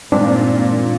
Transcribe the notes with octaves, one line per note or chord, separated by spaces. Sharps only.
G2 A#2 E3 G#3 C4 D4 D#4